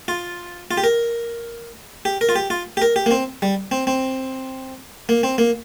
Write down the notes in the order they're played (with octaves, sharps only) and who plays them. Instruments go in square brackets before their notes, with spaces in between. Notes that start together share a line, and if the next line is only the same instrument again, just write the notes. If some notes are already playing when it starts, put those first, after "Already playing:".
[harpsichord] F4
F4
G4
A#4
G4
A#4
F4
G4
F4
G4
A#4
G4
A#3
C4
G3
C4
C4
A#3
C4
A#3